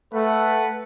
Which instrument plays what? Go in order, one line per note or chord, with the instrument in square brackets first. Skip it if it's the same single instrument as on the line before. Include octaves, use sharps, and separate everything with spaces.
[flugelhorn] A3 [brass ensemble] A4 B4 F#5